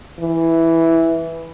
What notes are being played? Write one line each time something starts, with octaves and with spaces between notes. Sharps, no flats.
E3